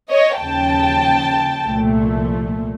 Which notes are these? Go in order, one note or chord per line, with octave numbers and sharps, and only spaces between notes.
C#5 D#5
D#2 C#3 F3 G5 A5
C2 A#2 F3 A3